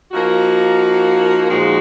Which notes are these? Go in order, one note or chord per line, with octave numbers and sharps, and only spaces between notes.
F3 A#3 D#4 F#4
A#2 F3 G#3 D#4 F#4